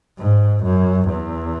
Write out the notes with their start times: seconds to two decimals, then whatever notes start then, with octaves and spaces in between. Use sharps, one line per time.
0.19 G#2
0.63 F#2
1.08 E2